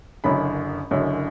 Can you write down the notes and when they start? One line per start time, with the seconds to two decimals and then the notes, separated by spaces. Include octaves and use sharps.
0.24 F#1 F#2 D3 B5
0.91 F#1 F#2 D3